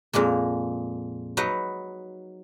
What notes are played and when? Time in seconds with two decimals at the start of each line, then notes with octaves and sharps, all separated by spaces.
0.13 F2 A#2 G#3 A#3
1.37 F#3 D#4 B4